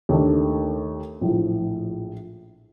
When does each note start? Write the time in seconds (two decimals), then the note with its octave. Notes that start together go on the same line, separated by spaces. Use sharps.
0.09 D#2 D#3 A3 D4
1.21 A#1 A2 F3